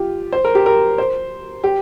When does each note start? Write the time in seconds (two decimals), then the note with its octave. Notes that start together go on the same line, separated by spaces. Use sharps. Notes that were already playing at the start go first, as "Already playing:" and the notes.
Already playing: F4 G4
0.33 C5
0.45 A#4
0.55 G4
0.66 A#4
0.98 C5
1.64 G4